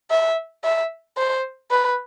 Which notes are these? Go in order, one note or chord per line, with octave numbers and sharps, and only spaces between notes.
E5
E5
C5
B4